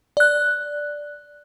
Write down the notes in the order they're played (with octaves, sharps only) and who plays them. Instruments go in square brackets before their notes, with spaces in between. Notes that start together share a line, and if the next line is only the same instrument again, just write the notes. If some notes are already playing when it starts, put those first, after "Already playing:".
[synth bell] D5 F#6